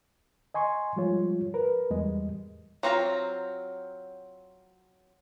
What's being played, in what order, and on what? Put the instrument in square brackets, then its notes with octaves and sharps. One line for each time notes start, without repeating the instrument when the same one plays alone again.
[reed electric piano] D#5 G#5 C6 C#6
F3 G3 G#3 F4 C#5
A#4 B4
E2 G3 G#3 D#5
[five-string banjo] F#3 C4 F4 A#5